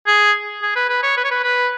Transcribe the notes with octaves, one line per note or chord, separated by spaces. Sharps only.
G#4
G#4
B4
B4
C#5
B4
C#5
B4
B4